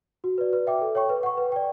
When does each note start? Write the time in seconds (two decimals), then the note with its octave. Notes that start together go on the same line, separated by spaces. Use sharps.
0.24 F#4
0.38 B4 D5
0.53 B4
0.67 E5 G5 D6
0.81 A4
0.95 C#5 G5 C#6
1.09 B4
1.23 F#5 C#6
1.38 B4
1.52 D5 G5